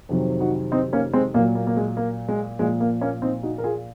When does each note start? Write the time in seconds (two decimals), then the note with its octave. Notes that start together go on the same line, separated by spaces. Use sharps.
0.09 F2 C3 D#3 F#3
0.40 D#4 F#4
0.72 C4 D#4
0.93 A#3 C#4
1.13 G#3 C4
1.34 A#2 F#3 A#3
1.55 A#3
1.67 A#3
1.77 G#3
1.97 A#3
2.29 G#3
2.59 A#2 F3 G#3
2.80 A#3
3.01 A#3 C#4
3.22 C4 D#4
3.43 D#4 F#4
3.58 A#4
3.64 F4 G#4